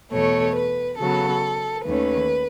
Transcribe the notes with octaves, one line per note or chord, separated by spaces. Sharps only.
E2 B2 A3 C#5
B4
C#3 F#3 B3 A4
D#2 D#3 A3 C#4 B4